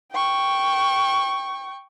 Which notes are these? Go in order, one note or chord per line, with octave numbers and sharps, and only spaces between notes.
G5 C#6